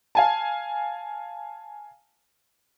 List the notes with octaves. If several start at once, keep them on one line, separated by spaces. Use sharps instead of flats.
F5 G#5 A5